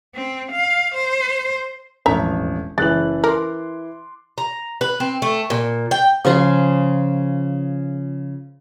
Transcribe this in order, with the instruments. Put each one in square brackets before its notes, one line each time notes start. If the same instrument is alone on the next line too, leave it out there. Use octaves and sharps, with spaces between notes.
[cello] C4
F5
C5
[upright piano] E1 A1 F2 [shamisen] E5 A#5
[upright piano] F#1 F#7 [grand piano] E3 F#6 A6 [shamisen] G#3
[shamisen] A#4 [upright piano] C6 D6
[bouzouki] A#5
B4
C4
A3
A#2
G5
[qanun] C#3 F3 F4 G#4